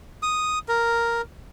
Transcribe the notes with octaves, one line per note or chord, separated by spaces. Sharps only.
D#6
A#4